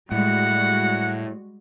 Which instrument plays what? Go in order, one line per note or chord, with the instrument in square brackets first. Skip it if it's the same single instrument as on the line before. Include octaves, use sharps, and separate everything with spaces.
[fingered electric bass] A2 [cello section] G3 G#3 F#4 [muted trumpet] F#5